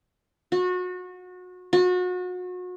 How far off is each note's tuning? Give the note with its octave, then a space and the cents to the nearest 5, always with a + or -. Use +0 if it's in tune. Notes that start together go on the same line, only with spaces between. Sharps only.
F#4 -30
F#4 -35